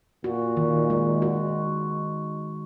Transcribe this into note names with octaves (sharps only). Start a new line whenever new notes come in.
A#2 F#4
D#3
G#3
F#4